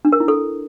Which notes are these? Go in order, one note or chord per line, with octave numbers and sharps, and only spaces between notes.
D4
A#4
E4
A4